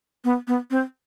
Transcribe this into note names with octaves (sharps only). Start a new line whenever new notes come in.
B3
B3
C4